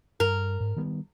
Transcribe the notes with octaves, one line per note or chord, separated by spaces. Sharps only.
G2 A#4
G#2
D#3 G3 B3